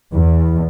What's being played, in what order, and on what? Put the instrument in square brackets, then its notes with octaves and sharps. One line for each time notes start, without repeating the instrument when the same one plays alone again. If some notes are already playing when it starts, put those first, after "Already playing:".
[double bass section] E2